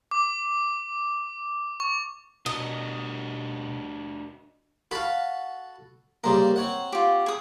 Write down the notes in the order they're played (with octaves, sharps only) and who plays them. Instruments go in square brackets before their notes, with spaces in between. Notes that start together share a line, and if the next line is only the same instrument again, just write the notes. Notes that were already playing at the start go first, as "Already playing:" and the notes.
[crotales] D6
C#6
[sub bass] B2 [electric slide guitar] D4 F#4 A#4 [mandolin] D#5
[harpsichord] F#4 A4 [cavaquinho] F5 B5
[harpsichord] C#3 G3 A#3 [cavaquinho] C5 A#5
[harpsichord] C4 C#5 F#5
[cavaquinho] F4 G4
G#4 D#6